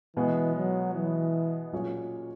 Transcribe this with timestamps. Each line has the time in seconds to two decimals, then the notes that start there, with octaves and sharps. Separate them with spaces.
0.16 B2 E3 G#3 B3
0.56 F#3
0.94 E3
1.73 A#2 F#3 C#4 G#4 C#5